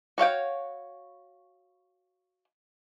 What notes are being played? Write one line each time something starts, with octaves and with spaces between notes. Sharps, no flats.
F#4 C#5 F5 G5